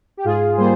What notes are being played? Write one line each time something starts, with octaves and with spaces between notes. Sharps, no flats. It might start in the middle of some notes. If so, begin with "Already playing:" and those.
G4
G#2 F4 G#4
G3 A#3 G#4 C5